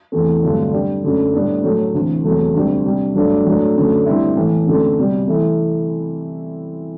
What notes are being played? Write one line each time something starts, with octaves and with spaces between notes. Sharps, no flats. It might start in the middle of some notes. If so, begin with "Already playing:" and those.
E2 C3 E3 A3
G2 D3 F#3 A3 C4
B2 G3 D4
F#2 D3 A3
A2 G3 B3 D4
A2 F#3 A3
D2 C3 E3
E2 C3 F#3 A3
D2 C3 G3
C3 G3 D4
G2 F#3 A3 D4
A2 F#3 A3 D4
F#2 D3 F#3 A3
D2 D3 G3 C4 E4
A2 E3 B3
F#2 D3 A3 C4
C2 B2 G3
C3 E3 A3 C4 E4